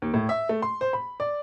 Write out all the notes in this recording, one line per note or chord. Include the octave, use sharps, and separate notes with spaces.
D#2
A2
E5
A3
C6
C5
B5
D5